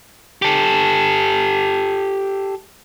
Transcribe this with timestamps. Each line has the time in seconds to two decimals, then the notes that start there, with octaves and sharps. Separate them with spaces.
0.42 G4 A4